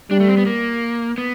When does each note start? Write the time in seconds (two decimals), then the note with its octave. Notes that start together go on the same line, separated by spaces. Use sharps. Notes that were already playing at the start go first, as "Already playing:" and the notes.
0.11 G3 D4
0.20 A3
0.29 C4
0.37 B3
0.46 A#3
1.18 B3